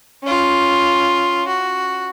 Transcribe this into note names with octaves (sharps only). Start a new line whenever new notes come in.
C#4 F4
F#4